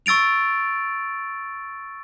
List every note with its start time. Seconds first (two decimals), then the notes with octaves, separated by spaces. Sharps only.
0.06 C#6 E6 A6 D7 F7